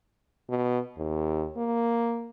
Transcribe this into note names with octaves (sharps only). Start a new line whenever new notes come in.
B2
D#2
A#3